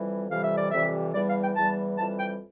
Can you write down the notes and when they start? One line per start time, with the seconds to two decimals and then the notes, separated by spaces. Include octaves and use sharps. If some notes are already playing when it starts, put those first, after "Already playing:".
Already playing: F2 E3 G3
0.30 F2 C3 E3 G3 F5
0.44 E5
0.57 D5
0.71 F2 C3 E3 G3 E5
1.14 E2 E3 G3 D5
1.28 F5
1.42 G5
1.56 E2 E3 G3 A5
1.98 F2 E3 G3 A5
2.19 G5